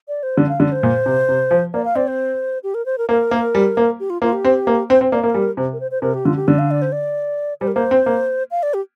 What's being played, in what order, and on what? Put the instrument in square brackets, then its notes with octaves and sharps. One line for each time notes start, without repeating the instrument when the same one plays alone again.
[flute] D5
C5
[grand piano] D3 [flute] D5
[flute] F5
[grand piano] D3 [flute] D5
[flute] C5
[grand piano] A#2
C3
C3
F3
[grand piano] A#3 [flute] D5
[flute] F5
[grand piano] C4 [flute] D5
[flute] C5
G4
A#4
C5
A#4
[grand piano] A#3 [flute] A#4
[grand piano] A#3
G3
A#3
[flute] G4
F4
[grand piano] A#3 [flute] F4
[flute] G4
[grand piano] C4
A#3
[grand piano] C4 [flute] C5
[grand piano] C4
[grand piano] A#3 [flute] D5
[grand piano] A#3 [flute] A#4
[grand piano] G3
C3
[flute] A#4
C5
C5
[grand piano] C3 [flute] A#4
[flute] G4
[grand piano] D3 [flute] F4
[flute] G4
[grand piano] D3 [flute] D5
[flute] F5
D5
C5
D5
[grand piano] G3 [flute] C5
[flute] A#4
[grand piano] A#3 [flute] C5
[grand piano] C4
A#3
[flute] F5
D5
G4